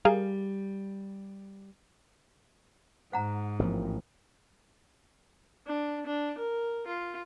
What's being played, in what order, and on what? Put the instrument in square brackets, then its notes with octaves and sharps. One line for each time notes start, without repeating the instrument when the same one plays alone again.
[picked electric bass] G3 [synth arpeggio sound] G#4 A#4 F5
[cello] G#2 [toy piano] C5 F#5 A#5
[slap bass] A1 [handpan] F3 A#3 C4
[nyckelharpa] D4
D4
A#4
F4